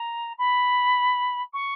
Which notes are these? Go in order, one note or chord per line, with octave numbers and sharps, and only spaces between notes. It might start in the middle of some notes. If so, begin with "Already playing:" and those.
Already playing: A#5
B5
C#6